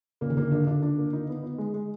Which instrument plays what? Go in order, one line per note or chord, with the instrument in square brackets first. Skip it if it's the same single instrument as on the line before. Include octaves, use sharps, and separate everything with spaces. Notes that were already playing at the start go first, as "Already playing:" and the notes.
[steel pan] C#3 [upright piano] A#3
[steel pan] D#3
[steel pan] D3 [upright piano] A#3
[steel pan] D3 [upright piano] D4
[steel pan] D3 [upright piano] D4
[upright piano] D4
A#3
D#4
B3
D#4
G#3
G#3